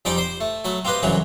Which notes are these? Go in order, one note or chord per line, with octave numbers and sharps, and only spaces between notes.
F2 G3 D#4 D5 G5 G#5
C5 C6
A3
F#3 A3 B5
C4 F4 G4 B4 D#5
C2 F#2 C#3 E3 F#3 G#4